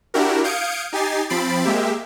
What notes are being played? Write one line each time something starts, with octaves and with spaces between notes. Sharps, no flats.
D4 E4 F#4 G4 A#4
F5 D#6 G6 G#6 C#7 D7
D#4 G4 G#5 A6 C7
F3 C4 B5 A6 C7 D7
G#3 A#3 G4 E5